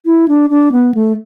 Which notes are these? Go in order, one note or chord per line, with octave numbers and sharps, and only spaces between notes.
E4
D4
D4
B3
A3